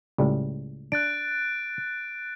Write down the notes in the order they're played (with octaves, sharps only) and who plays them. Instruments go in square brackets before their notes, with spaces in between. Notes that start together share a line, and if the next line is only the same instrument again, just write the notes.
[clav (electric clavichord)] C#2 A2 G3
[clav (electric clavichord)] D4 [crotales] F#6 A6 D7